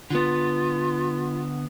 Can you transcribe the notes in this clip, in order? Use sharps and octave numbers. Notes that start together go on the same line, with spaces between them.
D3 B3 F4